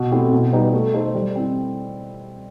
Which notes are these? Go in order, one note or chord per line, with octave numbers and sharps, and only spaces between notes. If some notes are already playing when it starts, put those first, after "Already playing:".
Already playing: B2
A3 C4 E4 G4
B2
G3 D#4 G4 B4
A3
D#4 A4 C5
G3
C4 E4